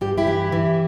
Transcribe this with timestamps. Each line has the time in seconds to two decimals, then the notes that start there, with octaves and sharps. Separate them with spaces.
0.01 G2 G4
0.18 E4 G4
0.27 E3
0.52 E3